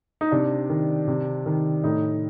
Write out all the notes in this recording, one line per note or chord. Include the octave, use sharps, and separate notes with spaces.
D#4
C3 D4
D#3
C3
D#3
A2 D#4